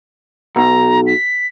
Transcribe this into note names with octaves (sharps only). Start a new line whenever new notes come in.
B1 A#5
B6